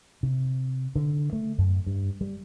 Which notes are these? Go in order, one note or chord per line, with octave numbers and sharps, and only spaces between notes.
C3
D3
A3
F#2
G2
G3